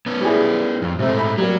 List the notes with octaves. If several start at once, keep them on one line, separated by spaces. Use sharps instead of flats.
B3 C#4
G3 E4 G#4
F2
G#2 C3 A3 C4
B5
F#3 G3 A#3